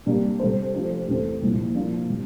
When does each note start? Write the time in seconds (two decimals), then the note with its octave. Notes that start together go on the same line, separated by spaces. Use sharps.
0.06 C3 G3 A#3 D4 G4
0.39 C3 G3 D4 A4 C5
0.74 F3 A3 D4 G4 C5
1.08 E2 C3 E3 A3 C4
1.42 C2 A#2 F3
1.75 F3 A#3 D4 F4
2.10 C3